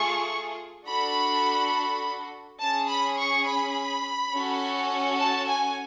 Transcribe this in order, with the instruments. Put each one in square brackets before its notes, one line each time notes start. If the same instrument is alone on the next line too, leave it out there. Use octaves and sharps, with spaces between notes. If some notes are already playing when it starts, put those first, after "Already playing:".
Already playing: [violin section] A3 F4 G#4 C#6
D4 F#4 A4 B5
C#4 G#4 A5
B5
C#6
B5
C#4 F#4 A4
A5
G#5